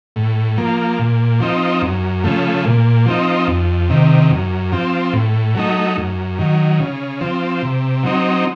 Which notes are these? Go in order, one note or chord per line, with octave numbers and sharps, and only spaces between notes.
A2
F3 A#3
A#2
F3 C4 D#4
F#2
C#3 F3 A3
A#2
F3 C4 D#4
F2
C3 D#3
F#2
F3 C4
A2
F#3 A3 D#4
F#2
D#3 F#3
C#3
F3 C4
C3
F#3 C4 D#4